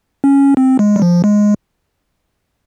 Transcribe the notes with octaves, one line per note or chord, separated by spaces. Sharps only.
C#4
C4
G#3
G3
F3
G#3